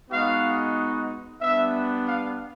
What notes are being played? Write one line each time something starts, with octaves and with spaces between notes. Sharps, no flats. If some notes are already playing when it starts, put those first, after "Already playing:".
G#3 B3 D#4 F#4 F5
G3 B3 D4 E5
F5